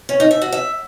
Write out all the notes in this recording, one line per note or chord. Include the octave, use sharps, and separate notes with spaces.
C#4
D#4
E5
F#4
E5